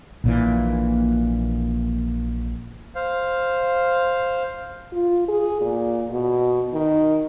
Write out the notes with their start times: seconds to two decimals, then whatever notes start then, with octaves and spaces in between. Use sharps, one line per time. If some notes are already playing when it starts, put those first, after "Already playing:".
0.24 A#1 A#2 E3
2.95 C5 F5
4.93 F4
5.28 G#4
5.61 A#2
6.10 B2
6.73 D#3